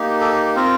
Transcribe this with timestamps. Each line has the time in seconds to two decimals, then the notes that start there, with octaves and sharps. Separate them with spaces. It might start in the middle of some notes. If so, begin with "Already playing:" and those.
Already playing: A#3 D#4 G4
0.21 A4
0.56 C4 F4 A#4